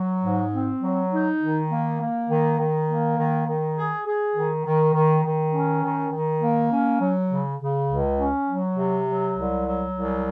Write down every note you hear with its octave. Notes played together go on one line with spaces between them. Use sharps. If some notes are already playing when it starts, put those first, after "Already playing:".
Already playing: F#3
G#2
C4
F#3
D#4
D#3
A#3
A#3
D#3
D#3
A#3
D#3
D#3
G#4
G#4
D#3
D#3
D#3
D#3
C#4
D#3
D#3
A#3
C#4
F#3
C#3
C#3
C#2
C#4
F#3
C3
F#3
C2
F#3
C2